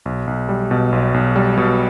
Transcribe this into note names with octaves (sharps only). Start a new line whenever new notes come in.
B1
B1
G3
B2
B1
B1
G3
B2